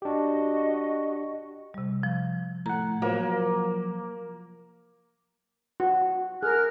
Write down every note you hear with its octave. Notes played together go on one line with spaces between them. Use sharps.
D4 F#4 G4 D#5
C3 G3
F3
A2 F#5 A#5
F3 F#3 A#3
F#4
G#4 A#4 F6 F#6